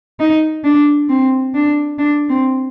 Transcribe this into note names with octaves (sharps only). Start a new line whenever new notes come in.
D#4
D4
C4
D4
D4
C4